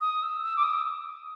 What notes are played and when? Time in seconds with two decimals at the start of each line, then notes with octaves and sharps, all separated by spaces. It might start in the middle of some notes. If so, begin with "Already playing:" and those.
0.01 D#6
0.22 E6
0.43 E6
0.56 D6
0.63 D#6